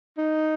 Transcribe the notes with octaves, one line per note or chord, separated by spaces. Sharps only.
D#4